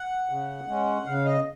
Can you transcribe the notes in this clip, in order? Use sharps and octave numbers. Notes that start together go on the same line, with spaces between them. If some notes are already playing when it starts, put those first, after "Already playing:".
Already playing: F#5
C#3
G#3 C#4
C#3 F5
D#5